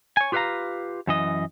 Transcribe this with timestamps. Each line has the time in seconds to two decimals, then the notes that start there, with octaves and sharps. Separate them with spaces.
0.17 C#5 G#5
0.32 F4 G4 B4 C#5 F5 A#5
1.07 F#2 E3 D#5